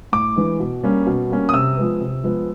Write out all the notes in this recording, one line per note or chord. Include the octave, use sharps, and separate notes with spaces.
A2 D6
E3 G#3
B2
G3 A#3 C#4
B2
G3 A#3 C#4
D#6
C3 E6
F3 G#3 B3
C3
F3 G#3 B3